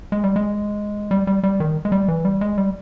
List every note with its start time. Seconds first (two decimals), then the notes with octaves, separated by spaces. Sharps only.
0.12 G#3
0.24 G3
0.36 G#3
1.11 G3
1.27 G3
1.43 G3
1.60 D#3
1.85 G#3
1.92 G3
2.08 E3
2.25 G3
2.41 G#3
2.58 G3